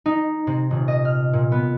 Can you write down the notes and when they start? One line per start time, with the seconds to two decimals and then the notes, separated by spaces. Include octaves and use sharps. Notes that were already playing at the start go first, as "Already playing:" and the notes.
0.06 D#4
0.47 C3
0.71 D#1
0.88 D#5
1.05 F6
1.33 A#2
1.52 B3